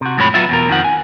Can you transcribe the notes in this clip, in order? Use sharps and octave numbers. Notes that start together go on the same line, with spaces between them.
C3 F#4
F2 A2 F3 G#3 C#5 B5
F#3 B3 F4 E5
E2 B2 A#4
F2 D#3 F3 F#5
G#5